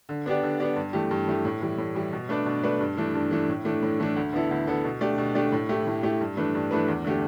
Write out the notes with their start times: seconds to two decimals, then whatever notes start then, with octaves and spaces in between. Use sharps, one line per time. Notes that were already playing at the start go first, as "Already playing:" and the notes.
0.09 D3
0.26 B3 D4 G4 D5
0.43 D3
0.60 B3 D4 G4 D5
0.76 G2
0.93 E3 A3 G4
1.11 G2
1.27 E3 A3 G4
1.45 A2
1.62 E3 G3
1.78 A2
1.95 E3 G3
2.13 B2
2.29 A3 D4 B4 D5
2.46 B2
2.63 A3 D4 B4 D5
2.80 G2
2.97 E3 A3 D4
3.15 G2
3.31 E3 A3 D4
3.49 A2
3.65 E3 A3 D4
3.82 A2
4.00 E3 A3 D4
4.16 D2
4.33 D3 B3 E4 A4
4.51 D2
4.67 D3 B3 E4 A4
4.84 B2
5.01 A3 D4 G4 D5
5.18 B2
5.35 A3 D4 G4 D5
5.52 A2
5.69 A3 E4 G4
5.87 A2
6.03 A3 E4 G4
6.21 G2
6.37 E3 A3 D4 B4
6.55 G2
6.71 E3 A3 D4 B4
6.88 E2
7.04 D3 A3 G4